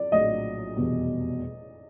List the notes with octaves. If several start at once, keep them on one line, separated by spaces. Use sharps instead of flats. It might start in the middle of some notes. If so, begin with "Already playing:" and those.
Already playing: D5
A#1 A2 F#3 D#5
F1 E2 B2 G3